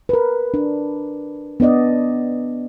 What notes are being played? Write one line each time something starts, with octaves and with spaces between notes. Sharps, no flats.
A#4 B4
D4
B3 D4 D5 D#5